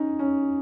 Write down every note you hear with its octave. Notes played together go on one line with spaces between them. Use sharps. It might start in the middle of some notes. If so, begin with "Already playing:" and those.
Already playing: C#4 D#4
C#4